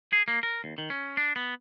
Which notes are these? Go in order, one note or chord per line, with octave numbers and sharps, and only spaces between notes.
G#4
A#3
A#4
D#2
D#3
C#4
D4
B3